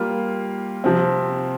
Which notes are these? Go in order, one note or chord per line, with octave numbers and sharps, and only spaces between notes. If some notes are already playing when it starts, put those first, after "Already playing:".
Already playing: G3 A#3 F4
C3 F3 C4